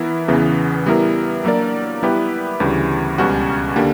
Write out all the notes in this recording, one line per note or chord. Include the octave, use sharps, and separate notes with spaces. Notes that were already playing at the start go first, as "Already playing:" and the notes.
Already playing: E3 B3 E4 A#4
E2 C#3 E3 B3
G3 B3 E4 A#4
F#3 A#3 D4 A#4 D5
G3 B3 E4 G4 B4
D2 C#3 E3 G3
C#2 B2 G3 C#4 F#4
D3 A#3 D4 G4